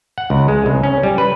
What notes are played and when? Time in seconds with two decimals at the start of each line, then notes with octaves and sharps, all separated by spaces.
0.18 F#5
0.30 C#2
0.48 G#3
0.66 C2
0.83 C#4
1.03 G3
1.18 B4